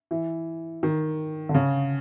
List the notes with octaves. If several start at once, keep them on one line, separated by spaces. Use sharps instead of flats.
E3
D#3
D3
C#3